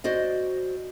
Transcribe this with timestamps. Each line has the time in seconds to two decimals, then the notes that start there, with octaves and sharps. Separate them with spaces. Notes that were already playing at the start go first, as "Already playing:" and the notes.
0.04 F#4 C5 D5 D#5